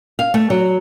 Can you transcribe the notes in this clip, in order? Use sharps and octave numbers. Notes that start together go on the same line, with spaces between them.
F5
A3
F#3